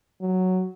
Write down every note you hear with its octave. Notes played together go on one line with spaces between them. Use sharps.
F#3